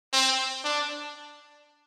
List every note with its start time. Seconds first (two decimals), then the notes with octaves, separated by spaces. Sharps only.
0.13 C4
0.64 D4